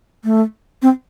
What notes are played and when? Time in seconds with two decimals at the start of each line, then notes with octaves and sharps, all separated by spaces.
0.24 A3
0.82 C4